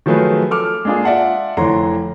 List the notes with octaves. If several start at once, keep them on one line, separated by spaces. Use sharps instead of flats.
D#3 F3 F#3 A3 G#4 B4
A4 D6 F6
G#3 A#3 D4 F4 G#4
F4 D5 E5 F#5 A5
F1 D3 E3 C#5 A#5 C6